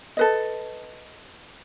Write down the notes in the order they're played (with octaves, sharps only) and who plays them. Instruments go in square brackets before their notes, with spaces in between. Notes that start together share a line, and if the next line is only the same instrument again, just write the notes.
[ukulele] A4 B4 D#5